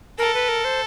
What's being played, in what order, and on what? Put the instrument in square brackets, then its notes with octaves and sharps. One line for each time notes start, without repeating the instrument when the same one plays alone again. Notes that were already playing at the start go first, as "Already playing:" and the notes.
[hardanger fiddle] A4 [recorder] A#4
[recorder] B4
A#4
C5